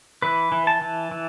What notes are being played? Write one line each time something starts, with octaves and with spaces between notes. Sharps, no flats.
E3 B4
E3
A5
E3
E3